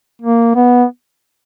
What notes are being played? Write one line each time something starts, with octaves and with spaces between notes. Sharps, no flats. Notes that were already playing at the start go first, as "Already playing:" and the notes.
A#3
B3